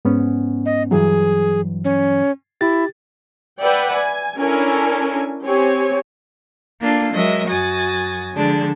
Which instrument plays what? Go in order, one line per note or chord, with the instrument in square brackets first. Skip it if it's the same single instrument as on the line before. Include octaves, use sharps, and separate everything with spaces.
[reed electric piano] G#2 B3 C#4
[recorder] D#5
[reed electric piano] G2 E3 F#3 [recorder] G#4
[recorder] C#4
[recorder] E4 [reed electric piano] G4 A6
[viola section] B4 D5 E5 F#5 G5
G#5
C#4 D4 E4 A4 A#4 G#5
C4 G4 C#5 G#5
[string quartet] A#3 D4 F4 A4
F#3 G#3 A#4 D#5 E5
F#2 F#4 G#5 D#6 A6
D3 F3 G#3 D4